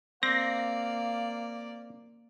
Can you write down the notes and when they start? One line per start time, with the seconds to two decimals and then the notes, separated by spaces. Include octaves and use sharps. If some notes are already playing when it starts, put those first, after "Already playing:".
0.23 A#3 C4 D5 F5 A#6